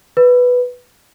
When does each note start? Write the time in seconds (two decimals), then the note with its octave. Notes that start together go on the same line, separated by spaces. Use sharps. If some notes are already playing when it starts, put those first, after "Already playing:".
0.17 B4